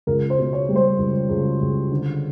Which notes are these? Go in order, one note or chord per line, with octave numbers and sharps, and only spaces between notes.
C#2 A#4
C5
B2
C#5
G3
C5
C#2
C#2
C#2
D3